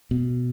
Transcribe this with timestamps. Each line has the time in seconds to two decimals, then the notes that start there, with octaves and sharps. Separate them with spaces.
0.11 B2